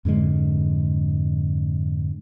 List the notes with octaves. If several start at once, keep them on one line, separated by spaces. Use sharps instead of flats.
F2 G#2 D3 G#3